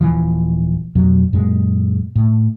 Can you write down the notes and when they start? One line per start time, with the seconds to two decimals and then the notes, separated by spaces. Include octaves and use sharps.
0.01 D#1 A#2 E3 F3
0.95 F2 B2 F#3
1.33 F#2 A#2 G#3
2.16 A2